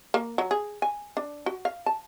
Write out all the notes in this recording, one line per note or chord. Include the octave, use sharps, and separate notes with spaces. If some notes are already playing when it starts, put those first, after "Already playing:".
A#3
F#3
G#4
G#5
D4
F#4
F5
A5